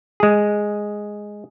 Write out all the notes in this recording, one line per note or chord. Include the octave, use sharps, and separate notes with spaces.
G#3 G#4